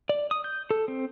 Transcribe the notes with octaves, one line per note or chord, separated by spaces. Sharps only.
D5
D#6
G6
A4
C4